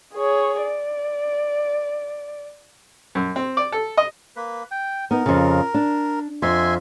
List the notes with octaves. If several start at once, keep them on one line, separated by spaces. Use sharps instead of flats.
G#4 C#5
D5
F#2
C4
D5
A4
D#5
A#3 B4
G5
B3 D#4 A#4
F2 C#3
D4
F2 E5 G#5 C6